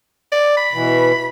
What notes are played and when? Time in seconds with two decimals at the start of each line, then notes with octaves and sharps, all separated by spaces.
0.32 D5
0.57 B5
0.73 B2 E3